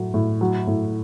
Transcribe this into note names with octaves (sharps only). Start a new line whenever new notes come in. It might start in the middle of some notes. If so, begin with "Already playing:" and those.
Already playing: A2 F#3 A3
A2
F#3
A2